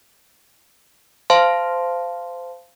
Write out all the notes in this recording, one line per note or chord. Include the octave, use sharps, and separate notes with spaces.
C5 F5 A5 C6